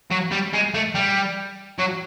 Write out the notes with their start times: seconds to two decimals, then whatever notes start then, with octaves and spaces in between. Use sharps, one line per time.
0.11 F#3
0.31 G3
0.53 G#3
0.74 A3
0.95 G3
1.78 F#3